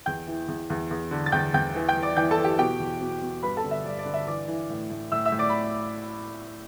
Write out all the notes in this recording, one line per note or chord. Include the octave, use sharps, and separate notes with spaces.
E2 G5 G6
E3
E2
E2
E2
D3
A6
E2 G5 G6
E2 G5 G6
E3
G5 G6
E3
D5 D6
E3 G5 G6
A4 A5
E3
G4 G5
B2 G4 G5
E2
B2
B2
G2 B4 B5
A4 A5
D3
E5
G2 D5
D5
D3
E5
E3 D5 D6
E3
A2
A2
A2 E5 E6
E5 E6
A2
D5 D6
B5